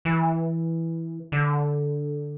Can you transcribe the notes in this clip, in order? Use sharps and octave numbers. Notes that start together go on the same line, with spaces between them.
E3
D3